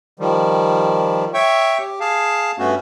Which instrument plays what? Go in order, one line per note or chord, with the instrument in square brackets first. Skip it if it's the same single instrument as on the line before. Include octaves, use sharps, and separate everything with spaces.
[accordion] D#3 F3 G3
C#5 E5 G5 C#6
G4
G#4 F5 A5
G2 A3 B3 C#4 F#4